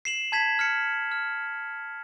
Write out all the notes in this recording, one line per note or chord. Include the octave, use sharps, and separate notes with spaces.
C7 E7 F#7
A5 G#6 B6 E7
F6 B6 C#7
F6